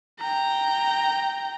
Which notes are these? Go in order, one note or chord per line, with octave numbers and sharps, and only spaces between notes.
G5 A#5